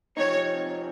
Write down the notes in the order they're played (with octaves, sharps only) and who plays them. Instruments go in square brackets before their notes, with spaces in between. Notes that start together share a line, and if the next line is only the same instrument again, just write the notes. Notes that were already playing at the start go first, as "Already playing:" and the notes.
[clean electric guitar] C3 F3 C4 D#4 [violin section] C#5